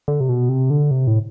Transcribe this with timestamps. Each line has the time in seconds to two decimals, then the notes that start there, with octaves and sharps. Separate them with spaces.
0.08 D3
0.20 C3
0.29 B2
0.49 C3
0.70 D3
0.91 C3
1.07 A2